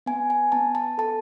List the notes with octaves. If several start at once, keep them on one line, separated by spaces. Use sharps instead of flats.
B3 G#5
G#5
B3 A5
A5
A4 A5